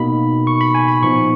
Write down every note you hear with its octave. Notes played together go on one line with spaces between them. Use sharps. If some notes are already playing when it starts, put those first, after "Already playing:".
Already playing: B2 A#3 D#4 B5
C#6
B5
G#5
B5
A#2 F3 B3 D#4 C#6